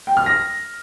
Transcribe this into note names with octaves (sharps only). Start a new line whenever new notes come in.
G5
F6
A#6